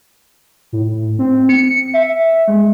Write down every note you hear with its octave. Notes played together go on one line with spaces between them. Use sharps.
A2
C4
C#7
C#7
E5
G#3